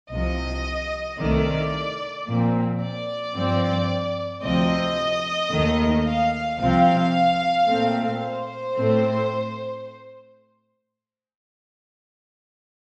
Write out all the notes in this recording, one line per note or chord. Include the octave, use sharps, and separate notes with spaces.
C2 C3 F3 D#5
C2 C3 D#3 A3 D5
A#2 F3 C4
D5
G2 F3 C4
D2 C3 F3 C4 D#5
D#2 D#3 A3
F5
C2 C3 F3 C4 F5
A#2 A3 C4
C5
A2 A3 C4